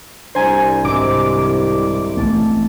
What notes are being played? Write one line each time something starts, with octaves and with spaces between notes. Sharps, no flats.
C2 D4 C5 G#5 A#5
G#1 C3 C4 D6
A1 A3 B3 A5